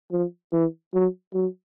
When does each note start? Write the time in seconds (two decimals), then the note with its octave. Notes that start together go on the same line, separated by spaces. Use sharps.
0.11 F3
0.52 E3
0.94 F#3
1.34 F#3